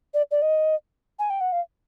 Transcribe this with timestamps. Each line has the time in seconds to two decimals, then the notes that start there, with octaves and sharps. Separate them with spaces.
0.14 D5
0.31 D5
0.42 D#5
1.19 G#5
1.30 G5
1.41 F#5
1.52 F5